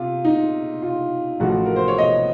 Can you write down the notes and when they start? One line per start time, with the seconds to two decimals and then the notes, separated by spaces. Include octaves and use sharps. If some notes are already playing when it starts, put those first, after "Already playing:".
Already playing: C3 F4
0.25 D#4
0.82 F4
1.40 A1 A2 F3 F#4
1.65 A#4
1.76 C5
1.88 C#5
1.98 D#5